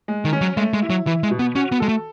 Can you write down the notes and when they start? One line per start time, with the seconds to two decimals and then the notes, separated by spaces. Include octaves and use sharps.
0.08 G#3
0.25 D#3
0.33 C#4
0.41 F#3
0.57 G#3 A3
0.74 G#3
0.83 E4
0.90 F#3
1.06 E3 E4
1.23 G#3
1.31 B2
1.39 B3
1.55 C#4 F#4
1.72 B3
1.80 G#3 A4
1.89 A3